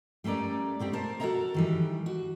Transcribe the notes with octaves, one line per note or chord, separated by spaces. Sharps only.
G3 A3 C#4 A#4 D5
B2 A3 C4 G4
A#4 C5 A5
F#4 A4 A#4 C#5 D#5 A#5
D#3 E3 G3
F#4